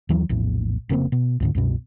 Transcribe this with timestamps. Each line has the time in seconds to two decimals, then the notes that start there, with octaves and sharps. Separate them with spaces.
0.09 D#2 E3 F#3
0.29 A#1 E2 A2
0.89 F1 C#3 A#3 C4
1.12 B2
1.40 C#2 G#2 D3
1.55 C2 F#2 B2